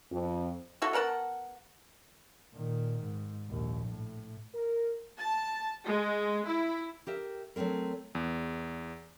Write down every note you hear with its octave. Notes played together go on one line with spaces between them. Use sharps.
F2
E4 F#4 A4
B3 A#4 F#5 A5
A#2 D#3
G#2
A#1 D#2
A2
A#4
A5
G#3
E4
G4 A#4 E5
F#3 A3 A#3 C4 A#4
E2